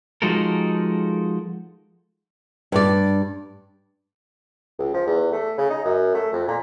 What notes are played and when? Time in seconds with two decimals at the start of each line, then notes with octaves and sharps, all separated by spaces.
0.22 F3 G#3 D#4 F#4 A4 A#4
2.72 G2 D5
4.79 C#2
4.94 F3
5.07 E2
5.32 A3
5.57 C#3
5.70 D#4
5.85 F#2
6.14 A3
6.33 F2
6.48 A#2